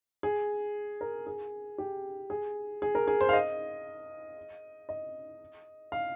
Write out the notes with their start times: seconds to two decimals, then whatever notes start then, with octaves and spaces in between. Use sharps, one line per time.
0.23 G#4
1.01 A#4
1.27 G#4
1.78 G4
2.30 G#4
2.82 G#4
2.95 A#4
3.08 G#4
3.21 C5
3.29 F5
3.33 D#5
4.89 D#5
5.92 F5